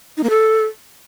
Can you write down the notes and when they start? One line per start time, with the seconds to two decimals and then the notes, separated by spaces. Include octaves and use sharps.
0.17 D#4
0.24 A#3
0.30 A4